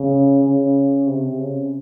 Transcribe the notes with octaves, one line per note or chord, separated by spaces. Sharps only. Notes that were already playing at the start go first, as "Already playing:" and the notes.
Already playing: C#3
C#3
C3
C#3